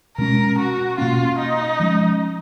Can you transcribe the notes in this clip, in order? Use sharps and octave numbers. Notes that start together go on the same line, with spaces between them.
B2 G#3 C#4 A#4
F#4
B2 A#3 C#4 F4
D#4
F3 G#3 C#4